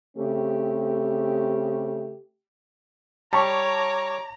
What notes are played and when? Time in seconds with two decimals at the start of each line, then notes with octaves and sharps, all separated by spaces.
0.17 C#3 A3 C4 G4
3.33 G3 C#5 A5 A#5 C#6 D6